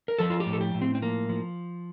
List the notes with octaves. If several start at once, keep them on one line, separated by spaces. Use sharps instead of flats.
A#4
F3 A4
F4
G4
A2
A4
G4
A2
C4
C4
F3 A#3
F3